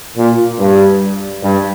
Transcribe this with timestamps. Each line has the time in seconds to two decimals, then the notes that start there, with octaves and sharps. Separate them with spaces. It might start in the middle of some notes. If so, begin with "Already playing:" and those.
0.17 A#2
0.59 G2
1.42 G2